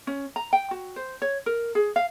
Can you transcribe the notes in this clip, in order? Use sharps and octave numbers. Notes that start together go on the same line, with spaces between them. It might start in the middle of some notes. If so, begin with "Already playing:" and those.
C#4
A#5
G5
F#4
C5
C#5
A#4
G#4
F5